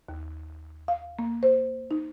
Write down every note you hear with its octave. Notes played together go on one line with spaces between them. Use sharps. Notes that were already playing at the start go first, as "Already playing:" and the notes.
D#2
F5
A#3
C5
D#4